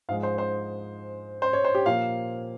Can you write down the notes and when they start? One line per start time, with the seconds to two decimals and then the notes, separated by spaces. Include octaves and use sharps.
0.09 G#2 F3 G#3 F5
0.23 C5
0.38 C5
1.42 C5
1.53 C#5
1.65 C5
1.75 G4
1.86 A#2 F3 A#3 F5